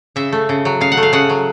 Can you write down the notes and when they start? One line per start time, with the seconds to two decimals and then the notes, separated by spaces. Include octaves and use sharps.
0.16 C#3 E5
0.32 A3
0.49 C#3
0.65 F#3
0.81 C#3 F5
0.92 F#5
0.97 A3
1.03 F5
1.13 C#3 F#5
1.30 F#3